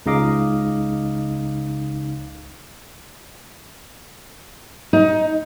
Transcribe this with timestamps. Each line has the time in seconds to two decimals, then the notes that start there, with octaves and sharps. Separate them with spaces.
0.06 C#2 C#3 D#4 D#5 F5 D6
4.93 D#4